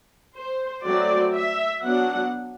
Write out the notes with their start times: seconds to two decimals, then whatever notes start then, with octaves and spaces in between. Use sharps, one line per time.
0.36 C5
0.84 F#3 A3 C4 D5
1.33 E5
1.81 F#3 B3 D4 F#5